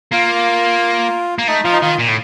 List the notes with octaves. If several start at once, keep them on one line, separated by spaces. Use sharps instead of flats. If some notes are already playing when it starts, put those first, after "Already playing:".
A#3 F4
A#3
A3 D#4
F3 F4
D#4
D#3 F4
A#2
A2